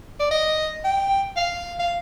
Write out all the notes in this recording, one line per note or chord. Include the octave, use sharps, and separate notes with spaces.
D5
D#5
G5
F5
F5